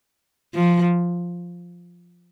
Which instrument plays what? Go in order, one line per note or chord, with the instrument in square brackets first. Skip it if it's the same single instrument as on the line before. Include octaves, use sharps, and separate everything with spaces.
[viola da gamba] F3